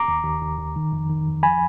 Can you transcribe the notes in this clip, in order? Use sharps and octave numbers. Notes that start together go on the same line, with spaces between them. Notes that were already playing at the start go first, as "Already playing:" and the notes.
Already playing: A#5 D6
D#2
D#2
D#2
D#2
D#3
F2
D#3
F2
F3 G#5 B5